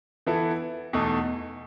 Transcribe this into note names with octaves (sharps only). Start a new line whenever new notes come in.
E3 B3 E4 A4
E2 B2 A3 D#4